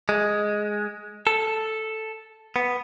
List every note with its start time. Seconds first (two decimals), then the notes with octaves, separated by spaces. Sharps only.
0.09 G#3
1.27 A4
2.56 B3